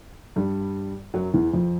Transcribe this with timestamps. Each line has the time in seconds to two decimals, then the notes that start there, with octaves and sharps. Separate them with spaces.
0.36 G2 G3
1.14 F#2 F#3
1.34 E2 E3
1.53 F2 F3